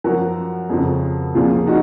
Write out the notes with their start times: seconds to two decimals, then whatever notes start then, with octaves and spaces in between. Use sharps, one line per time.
0.04 F#2 F3 F#4 A#4
0.70 F2 C#3 F3
1.34 C2 A#2 F3 F4 G#4
1.67 D#4 F#4